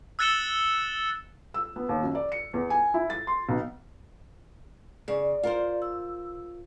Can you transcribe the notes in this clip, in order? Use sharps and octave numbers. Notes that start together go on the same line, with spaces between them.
E6 F#6 A6 C#7 E7 G7
E6
B3
D#2
F#2
D5
C#7
E2
G#5
E4
A6
C6
B1
C#3 D5
F4 A#4 C5
E6